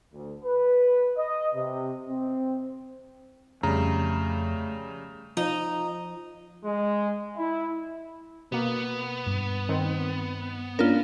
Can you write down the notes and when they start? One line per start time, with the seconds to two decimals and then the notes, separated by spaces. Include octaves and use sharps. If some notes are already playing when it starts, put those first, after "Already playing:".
0.13 D2
0.45 B4
1.17 D#5
1.55 C3
2.09 C4
3.63 F2 C#3 G3 A3 A#5
5.37 F3 D#4
6.64 G#3
7.36 E4
8.52 B2 A#3 B3
9.27 G2
9.69 D#3 C4
10.79 A#3 C#4 D4 F4 A#4